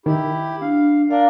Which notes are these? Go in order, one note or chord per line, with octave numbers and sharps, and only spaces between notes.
D#3 E4 G4
D4 F5
D4 A#4 D5 F5